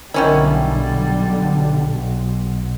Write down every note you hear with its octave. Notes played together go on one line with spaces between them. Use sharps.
B1 D3 D#3 G3 C#4 E4